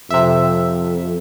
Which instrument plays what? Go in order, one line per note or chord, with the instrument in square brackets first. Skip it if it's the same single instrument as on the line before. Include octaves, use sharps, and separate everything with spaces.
[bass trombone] F2 [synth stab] C3 E5